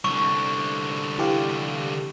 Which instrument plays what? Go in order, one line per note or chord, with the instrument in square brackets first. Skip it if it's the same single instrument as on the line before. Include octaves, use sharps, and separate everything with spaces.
[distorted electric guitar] C2 D3 [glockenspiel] C#6
[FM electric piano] E3 G4 F5